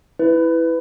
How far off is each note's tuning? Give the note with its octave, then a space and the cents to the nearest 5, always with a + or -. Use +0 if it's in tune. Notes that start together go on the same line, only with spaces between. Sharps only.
E4 +0 B4 +10